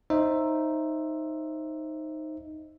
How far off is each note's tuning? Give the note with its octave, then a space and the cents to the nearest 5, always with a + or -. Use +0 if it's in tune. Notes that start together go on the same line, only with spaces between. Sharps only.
D#4 +0 C5 +20 E5 +5